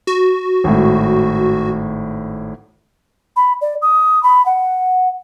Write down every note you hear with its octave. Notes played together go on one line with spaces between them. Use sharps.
F#4
G#1 A2
B5
D5
D#6
B5
F#5